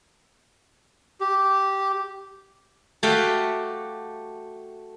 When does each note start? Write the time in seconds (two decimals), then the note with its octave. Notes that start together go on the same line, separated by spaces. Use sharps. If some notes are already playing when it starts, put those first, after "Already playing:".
1.21 G4
3.03 A3 F#4 G4 E5 F5 G5